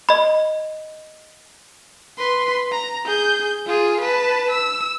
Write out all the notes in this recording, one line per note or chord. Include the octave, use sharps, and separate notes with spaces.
D#5 B5
B4 C6
A#5
G#4 G6
F4 G#4
B4 A5
E6